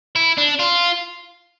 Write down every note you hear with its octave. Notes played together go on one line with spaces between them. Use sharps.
E4
D4
F4